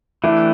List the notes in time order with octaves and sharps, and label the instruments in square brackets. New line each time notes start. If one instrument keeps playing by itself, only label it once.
[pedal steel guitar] E3 A3 D4 G4 [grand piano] E4